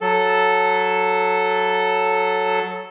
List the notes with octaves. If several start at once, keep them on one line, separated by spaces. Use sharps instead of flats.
F#3 A4